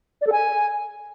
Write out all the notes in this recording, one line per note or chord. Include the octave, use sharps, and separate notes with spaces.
D5
A4
G#5